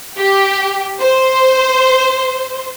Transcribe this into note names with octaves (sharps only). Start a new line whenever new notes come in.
G4
C5